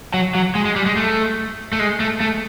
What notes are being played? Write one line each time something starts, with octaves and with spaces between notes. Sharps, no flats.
F#3
F#3
G#3
G#3
G3
G#3
A3
A3
G#3
A3
A3